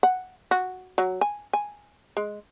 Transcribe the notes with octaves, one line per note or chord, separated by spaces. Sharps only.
F#5
F#4
F#3
G#5
G#5
G#3